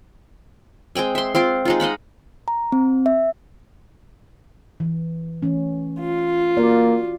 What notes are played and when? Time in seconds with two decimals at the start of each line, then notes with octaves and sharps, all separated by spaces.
0.95 G#3 C4 G5 G#5
1.15 E5 C6
1.35 C4 F4 C6 D6
1.65 G#3 D#4 F4
1.80 D#5 F5 F#5 B5
2.48 A#5
2.72 C4
3.06 E5
4.80 E3
5.42 E3 A3 C#4
5.99 F4
6.57 A#3 F#4 D5